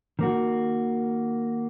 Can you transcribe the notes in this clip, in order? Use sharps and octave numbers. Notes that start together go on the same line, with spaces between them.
D#3 A#3 F#4